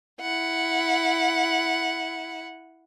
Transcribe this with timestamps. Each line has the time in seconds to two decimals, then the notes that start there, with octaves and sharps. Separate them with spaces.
0.21 E4 F#5